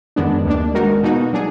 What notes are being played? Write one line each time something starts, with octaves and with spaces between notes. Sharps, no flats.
F#2 D#3 G#3 B3 D4
D#2 D#3 A#3 D4
D#3 G#3 D#4 F#4 A#4
B2 A#3 D#4 F#4
F#3 D4 G#4